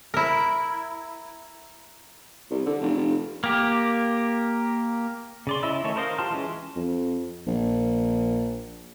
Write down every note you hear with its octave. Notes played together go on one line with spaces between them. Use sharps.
E4 A#4
C2
D3
F1
F1
A#3 G4
C#3 D5 C6
C#4 E4 D#5 B5 E6
D#3 A3 C#4 A4 C#5
A#4 C5 D#5 F5
F4 G4 A5 C6 F6
E3 G#3 C#4
F2
A#1